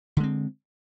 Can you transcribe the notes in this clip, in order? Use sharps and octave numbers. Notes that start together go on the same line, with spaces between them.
D3 G#3 C4